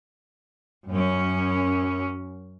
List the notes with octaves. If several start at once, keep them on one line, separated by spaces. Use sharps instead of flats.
F#2 C#4